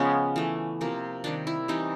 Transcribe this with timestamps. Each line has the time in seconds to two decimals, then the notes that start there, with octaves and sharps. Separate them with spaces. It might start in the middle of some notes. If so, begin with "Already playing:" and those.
Already playing: C#3 F3 G#3 B3 C#4
0.36 E3 A3
0.81 C3 F3 A#3
1.24 C3 D#3 G3 D4
1.47 E4
1.68 C3 E3 G3 D#4